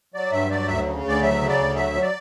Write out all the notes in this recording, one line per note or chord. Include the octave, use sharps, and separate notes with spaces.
F#3 D5
G2 E5
F#3 D5
D2 E5
C#3
D2 D5
F#3 E5
C#3
D5
D2
F#3 E5
F#3
D5